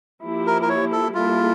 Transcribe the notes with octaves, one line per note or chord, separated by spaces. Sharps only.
F3 A#3 E4 G4
A#4
A#4
C#5
A4
G3 A#3 E4 F4 A4